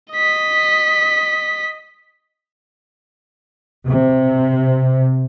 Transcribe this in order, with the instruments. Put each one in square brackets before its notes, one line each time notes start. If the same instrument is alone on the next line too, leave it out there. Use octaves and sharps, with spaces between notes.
[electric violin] D#5 B6
[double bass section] C3